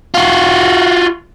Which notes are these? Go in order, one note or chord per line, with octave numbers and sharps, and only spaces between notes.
F4 F#4